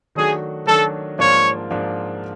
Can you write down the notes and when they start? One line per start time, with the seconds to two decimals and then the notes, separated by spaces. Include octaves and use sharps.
0.15 D#3 F#3 A3 D4 F#4 G#4
0.66 D#3 F#3 A3 D4 F#4 A4
1.18 G#2 F3 A#3 D4 F4 C#5
1.71 G#2 F3 A#3 D4 F4